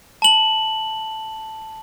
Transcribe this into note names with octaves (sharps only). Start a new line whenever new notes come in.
A5 F#7